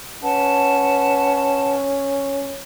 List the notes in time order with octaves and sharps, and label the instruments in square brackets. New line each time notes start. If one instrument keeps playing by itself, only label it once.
[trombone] C#4 [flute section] B4 F#5 A5